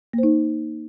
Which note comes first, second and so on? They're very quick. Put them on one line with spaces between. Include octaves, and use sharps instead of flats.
A#3 C5 D#4